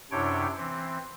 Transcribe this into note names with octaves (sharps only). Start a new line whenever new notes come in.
F#2 C3 D4 E4 C#5 G5
E3 C4